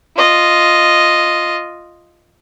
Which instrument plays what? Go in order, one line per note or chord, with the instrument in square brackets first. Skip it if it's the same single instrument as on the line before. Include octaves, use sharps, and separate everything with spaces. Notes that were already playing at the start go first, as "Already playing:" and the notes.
[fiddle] F4 D#5